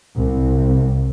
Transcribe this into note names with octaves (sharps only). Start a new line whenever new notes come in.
C2